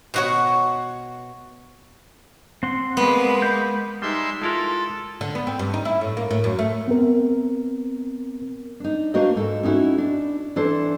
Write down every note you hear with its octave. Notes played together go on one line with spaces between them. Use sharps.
B2 F#4 C#5
C4 F#5 C6
G#3 A#3 B3 B4
G6
G3 G#3 D#4 E5 C6
G#3 E4 F4 A4 A#4
D3
B3
C4
G2
D#4
E4
A2
A#3
A2
F#2
A3
B3 C4 A#4
D4 D#4
A#3 D4 F#4 A#4 C5 D#5
G#2 A4
C#4 D#4 E4 F#4
D4
E3 D4 A4 C5